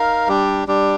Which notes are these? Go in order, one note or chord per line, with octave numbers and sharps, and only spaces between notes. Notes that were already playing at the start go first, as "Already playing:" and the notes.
Already playing: D#4 A#4 F5
G3 D4 G4
G3 D4 G4